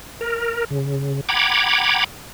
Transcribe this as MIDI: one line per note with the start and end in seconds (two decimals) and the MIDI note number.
0.21 0.65 70
0.71 1.21 49
1.29 2.04 78
1.29 2.04 79
1.29 2.04 82
1.29 2.04 83
1.29 2.04 86
1.29 2.04 92